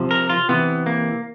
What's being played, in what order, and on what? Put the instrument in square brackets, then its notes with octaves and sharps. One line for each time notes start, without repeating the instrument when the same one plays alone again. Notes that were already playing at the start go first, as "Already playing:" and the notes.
Already playing: [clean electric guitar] C3 F3
A#4
F4
C3 E3 B3
A#3